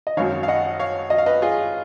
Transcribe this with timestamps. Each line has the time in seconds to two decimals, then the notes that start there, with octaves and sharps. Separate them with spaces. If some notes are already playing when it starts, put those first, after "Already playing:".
0.07 D#5
0.17 G#1 F#2 D#3 C#5 F5
0.43 F5
0.48 D#5 F#5
0.79 C#5 F5
1.10 D#5
1.18 F5
1.26 B4 D#5
1.42 F4 G#4